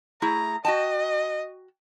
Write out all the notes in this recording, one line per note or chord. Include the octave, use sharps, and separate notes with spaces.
A3 E4 G#4 A#5
F#4 D#5 G5 A5